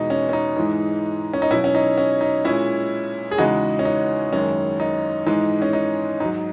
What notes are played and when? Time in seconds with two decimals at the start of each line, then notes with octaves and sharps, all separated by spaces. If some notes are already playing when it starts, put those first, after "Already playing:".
Already playing: E2 B2 G#3 D#4
0.10 C#4
0.29 C#4
0.33 D#4
0.56 G#2 E3 G#3
1.33 C#4
1.42 D#4
1.51 B2 F#3 C#4 E4
1.64 C#4
1.75 D#4
1.98 C#4
2.21 D#4
2.44 A#2 G#3 C#4 E4
3.31 G#4
3.38 E2 C#3 E3 G#3 D#4 F#4
3.79 C#4
3.85 D#4
4.33 F#2 D#3 G#3 C#4
4.80 D#4
5.26 G#2 E3 G#3 D#4
5.62 C#4
5.73 D#4
6.20 G#2 D#4
6.25 F#3